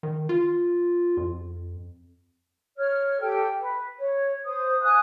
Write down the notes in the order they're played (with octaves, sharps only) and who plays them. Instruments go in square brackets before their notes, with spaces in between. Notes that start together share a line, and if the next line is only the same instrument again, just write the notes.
[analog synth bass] D#3
F4
F2
[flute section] C#5 F6
G4 A4 G5
B4
C#5
C5 D#6
F5 G#5 D#6 F#6